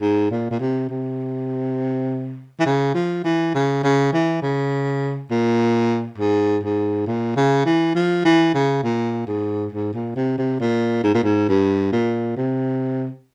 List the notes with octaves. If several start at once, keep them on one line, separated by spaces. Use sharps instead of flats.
G#2
A#2
A#2
C3
C3
E3
C#3
F3
E3
C#3
C#3
E3
C#3
A#2
G#2
G#2
A#2
C#3
E3
F3
E3
C#3
A#2
G#2
G#2
A#2
C3
C3
A#2
G#2
A#2
G#2
G2
A#2
C3